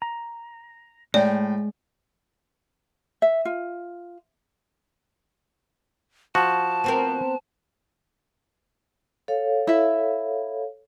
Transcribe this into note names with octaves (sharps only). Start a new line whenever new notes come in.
A#5
A2 G#3 D5 G5
E5
F4
F3 F#4 A5
B3 C4 A#4
A4 C#5 F5
E4 E5